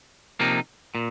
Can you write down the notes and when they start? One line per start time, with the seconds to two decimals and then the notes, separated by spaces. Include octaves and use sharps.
0.40 C3 F3 A#3 D#4
0.95 A#2